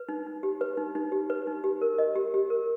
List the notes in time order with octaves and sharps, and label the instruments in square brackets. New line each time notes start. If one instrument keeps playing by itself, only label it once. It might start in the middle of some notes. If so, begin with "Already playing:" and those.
Already playing: [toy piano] B4
D#4
D#4
G4
B4
D#4
D#4
G4
B4
D#4
G4
A#4
D#5
G4
G4
A#4